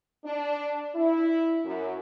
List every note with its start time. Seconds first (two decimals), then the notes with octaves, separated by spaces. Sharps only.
0.25 D4
0.95 E4
1.65 F#2